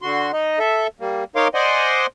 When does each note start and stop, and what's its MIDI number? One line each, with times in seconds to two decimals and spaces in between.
0.02 0.32 50
0.02 0.32 66
0.02 0.32 84
0.33 0.59 63
0.33 0.59 75
0.59 0.87 69
0.59 0.87 76
1.00 1.24 55
1.00 1.24 58
1.36 1.48 63
1.36 1.48 70
1.36 1.48 73
1.36 1.48 77
1.36 1.48 84
1.36 1.48 86
1.54 2.06 72
1.54 2.06 74
1.54 2.06 75
1.54 2.06 78
1.54 2.06 80
1.54 2.06 84